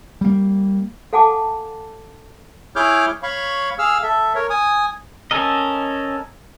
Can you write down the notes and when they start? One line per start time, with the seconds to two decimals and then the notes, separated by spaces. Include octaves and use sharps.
0.21 G3 A#3
1.13 A4 F5 F#5 G#5 A5 D6
2.76 E4 G#4 C#5 D6 F6 G6
3.23 C#5 F5 B5 C#6
3.79 G#4 F5 E6 F6
4.03 A4 E5
4.35 A#4 C#5
4.50 G#5 D#6
5.31 C#4 A4 A#4 D#5